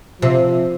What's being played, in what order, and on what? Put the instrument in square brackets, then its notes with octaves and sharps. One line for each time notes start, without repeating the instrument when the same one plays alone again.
[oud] C3 [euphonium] F3